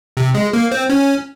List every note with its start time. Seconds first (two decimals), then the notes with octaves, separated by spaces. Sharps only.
0.17 C3
0.35 G#3
0.53 A#3
0.72 C4
0.90 C#4